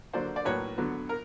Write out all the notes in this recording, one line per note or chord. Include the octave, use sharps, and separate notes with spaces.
D3 F#3 A#3 C5 D5
D5
A2 F#3 A#3 B4 C#5
D3 F#3 B3
A#4